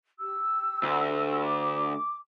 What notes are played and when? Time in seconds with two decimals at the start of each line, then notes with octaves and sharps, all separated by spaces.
0.19 G4 E6
0.83 D2
1.45 D6